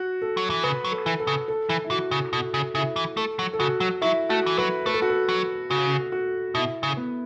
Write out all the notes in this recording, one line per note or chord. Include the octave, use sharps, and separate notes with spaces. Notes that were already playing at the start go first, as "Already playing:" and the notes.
Already playing: F#4
A4
F#3
E3
C#3 B4
F#3
A4
E3
A4
C#3
A4
E3
E4
E3 F#4
C#3
B2 F#4
C#3
C#3 E4
E3
A3 A4
F#3
A4
C#3 F#4
F#3
F#3 E4
A3 F#4
E3
F#3 B4
A3 B4
A4
F#4
A4
F#3
C#3 F#4
F#4
B2 E4
C#3
B3